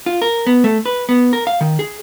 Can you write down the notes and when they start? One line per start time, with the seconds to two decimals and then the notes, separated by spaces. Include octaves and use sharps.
0.06 F4
0.22 A#4
0.47 B3
0.64 A3
0.86 B4
1.09 B3
1.33 A#4
1.47 F5
1.61 D#3
1.79 G#4